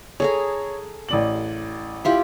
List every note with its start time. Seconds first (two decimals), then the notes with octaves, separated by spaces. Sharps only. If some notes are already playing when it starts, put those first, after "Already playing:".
0.20 G#4 A4 C#5 A#5
1.09 A1 D5 F#7
2.05 E4 F4 G4